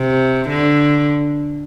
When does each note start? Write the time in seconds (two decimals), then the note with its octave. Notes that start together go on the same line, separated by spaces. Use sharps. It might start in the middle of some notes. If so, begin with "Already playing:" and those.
Already playing: C3
0.48 D3